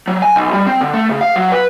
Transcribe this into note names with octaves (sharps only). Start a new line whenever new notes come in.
F#3
G#5
B1
G3
C4
D3
A3
C#3
F5
F#3
B4